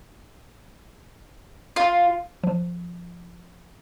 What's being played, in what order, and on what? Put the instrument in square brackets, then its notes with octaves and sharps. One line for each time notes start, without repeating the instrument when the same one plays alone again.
[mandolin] F4
[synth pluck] F3